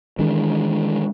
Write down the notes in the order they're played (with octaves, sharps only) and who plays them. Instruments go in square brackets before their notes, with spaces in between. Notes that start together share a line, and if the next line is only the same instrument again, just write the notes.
[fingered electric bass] D#3 E3 G#3 D4